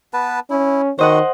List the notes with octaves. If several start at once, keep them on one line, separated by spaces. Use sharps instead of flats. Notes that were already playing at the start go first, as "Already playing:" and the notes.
B3 B4 A5
C#4 E4
D#3 F#4 C5 D#5 F#5